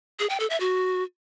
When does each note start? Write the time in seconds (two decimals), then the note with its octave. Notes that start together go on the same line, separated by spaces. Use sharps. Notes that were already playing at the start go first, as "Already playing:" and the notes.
0.19 G#4
0.30 G5
0.40 A4
0.50 E5
0.60 F#4